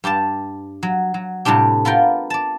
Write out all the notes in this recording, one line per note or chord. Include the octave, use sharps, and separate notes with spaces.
G2 G4 D5 A5
F#3
F#3
A2 C3 G3 D4 G4
B3 F4 A#4 G5
D5 A5